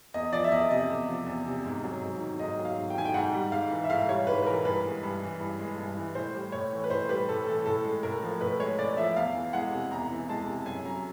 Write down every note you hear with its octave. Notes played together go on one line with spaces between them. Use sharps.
E2 D#5
F3 D5
E5
E2 D#5
C3 D#5
E2
F3
E2
C3
G#2
F#3
G#2
D#3
G#2 D#5
F#3
F5
G#2
G5
D#3 G#5
G5
G#2 F#5
G3
G#2 F5
E3
E5
G#2 F5
G3 C#5
G#2 B4
B4
E3 A#4
G2 B4
G#3
G2
E3
G2
G#3
G2
E3
A2 C5
G3
A2 C#5
E3
B4
A2 C5
G3 B4
A2 A4
E3 A4
A2 A4
G#3
A2 A#4
F3
A2 B4
G#3 C#5
A2 D5
F3 E5
E2 F5
E3
G#3 F#5
C3
E2 A#5
E3
G#3 A5
C3
F#2 G#5
F#3 A#5